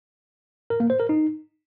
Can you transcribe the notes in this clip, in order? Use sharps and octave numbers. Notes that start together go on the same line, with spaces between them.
A#4
A#3
C5
A#4
D#4